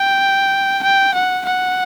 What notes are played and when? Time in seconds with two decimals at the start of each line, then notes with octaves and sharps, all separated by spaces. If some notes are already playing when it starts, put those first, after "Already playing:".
Already playing: G5
0.83 G5
1.14 F#5
1.45 F#5